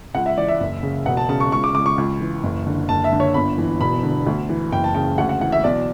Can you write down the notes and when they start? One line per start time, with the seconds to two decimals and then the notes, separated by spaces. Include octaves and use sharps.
0.15 C#2 F#5
0.26 E5
0.37 E3 D5
0.48 E5
0.60 F#1
0.83 C#3
1.06 E1 F#5
1.17 A5
1.29 C#3 A5
1.40 C#6
1.52 C#2 C#6
1.64 D6
1.75 C#2 D6
1.86 C#6
1.98 C#2
2.20 E3
2.43 F#1
2.66 D3
2.89 F#1 A5
3.04 E5
3.12 D3
3.20 C#5
3.34 G1 B5
3.58 E3
3.80 E1 B5
4.03 D3
4.27 D2
4.49 E3
4.72 F#1 G5
4.84 A5
4.95 C#3 G5
5.18 D2 F#5
5.29 F#5
5.41 E3 F#5
5.52 E5
5.64 B1 D5